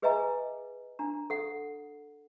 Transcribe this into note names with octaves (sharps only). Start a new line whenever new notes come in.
G#4 B4 D#5 E5 G#5 A#5
D4 A#5
A4 F#5